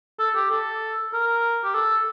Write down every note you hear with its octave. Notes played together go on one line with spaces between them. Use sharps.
A4
G4
A4
A#4
G4
A4